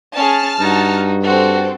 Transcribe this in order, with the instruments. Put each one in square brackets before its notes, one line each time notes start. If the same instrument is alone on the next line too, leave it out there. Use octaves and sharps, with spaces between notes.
[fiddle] C#4 G#4 [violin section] A5 F6
[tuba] G2 [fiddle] D#4 F#4
[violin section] C4 A4 [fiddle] F#4